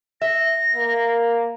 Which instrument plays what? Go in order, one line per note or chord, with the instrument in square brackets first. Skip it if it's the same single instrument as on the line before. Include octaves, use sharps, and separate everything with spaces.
[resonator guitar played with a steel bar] E5 [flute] A#6
[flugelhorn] A#3